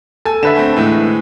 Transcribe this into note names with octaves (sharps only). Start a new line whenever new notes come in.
A4 G#5 E6
D3 B4 E5 E7
A3 C4
A2 E3 G#3